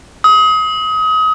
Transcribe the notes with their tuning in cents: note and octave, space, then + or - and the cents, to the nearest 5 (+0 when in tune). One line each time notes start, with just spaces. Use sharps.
D#6 +30